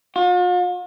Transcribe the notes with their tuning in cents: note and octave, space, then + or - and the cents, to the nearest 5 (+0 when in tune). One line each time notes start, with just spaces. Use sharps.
F4 +45